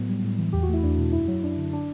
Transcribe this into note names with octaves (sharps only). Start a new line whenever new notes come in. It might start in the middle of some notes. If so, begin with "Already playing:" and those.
Already playing: A2 F#3 B3
G3
A2
E3
E2 G4
F#4
A3 E4
E2 D4
B2
F#2 E4
F#3
F#2 D4
D3
D4